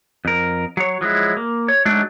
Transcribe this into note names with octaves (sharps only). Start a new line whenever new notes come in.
F2 A#4
F#3 C#5
F3 F#3 G#3 E4
A#3
C#5
F#3 G#3 A3 D4 D#4 F#4